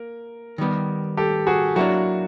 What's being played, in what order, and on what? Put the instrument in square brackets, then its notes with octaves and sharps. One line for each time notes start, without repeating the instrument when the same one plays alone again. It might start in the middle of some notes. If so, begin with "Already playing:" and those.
Already playing: [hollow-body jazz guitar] A#3 [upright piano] A#4
[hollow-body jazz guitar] D#3 G3 B3
[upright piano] G4 A4
F#4 G#4
[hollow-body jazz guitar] F#3 A#3 D4 [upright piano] E4 F#4